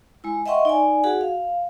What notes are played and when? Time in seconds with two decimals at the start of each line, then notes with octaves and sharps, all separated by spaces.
0.24 G#3 E4
0.46 D#5 E5 F#5 G5 C6 C#6
0.65 D#4 D5 G#5
1.04 F#4 G#4 F#5
1.21 F5